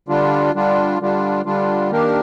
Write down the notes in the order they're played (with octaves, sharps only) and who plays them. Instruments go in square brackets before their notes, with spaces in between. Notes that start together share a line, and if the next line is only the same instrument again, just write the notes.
[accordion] D3 G3 D4 F4
D3 G3 D4 F4
D3 G3 D4 F4
D3 G3 D4 F4
D#3 A#3 D4 G4 A#4